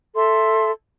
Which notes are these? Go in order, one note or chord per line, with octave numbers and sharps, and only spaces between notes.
A4 E5 A5 C6